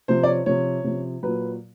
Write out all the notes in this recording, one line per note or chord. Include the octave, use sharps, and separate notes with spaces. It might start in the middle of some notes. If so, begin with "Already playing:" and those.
C3 F3 C5
D5
C#5
C3 F3 C#5
C3 F3
A#2 F#3 B4